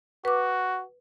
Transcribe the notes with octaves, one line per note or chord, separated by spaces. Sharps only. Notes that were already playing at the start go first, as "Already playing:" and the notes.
F#4 B4 D6